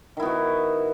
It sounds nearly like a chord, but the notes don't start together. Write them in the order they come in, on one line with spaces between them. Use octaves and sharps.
D#3 E4 B3 F#4